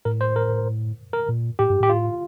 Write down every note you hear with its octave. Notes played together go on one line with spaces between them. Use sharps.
A2 A#4
C5
A#4
A#4
A#2
A2 G4
G2
A2 G4
F4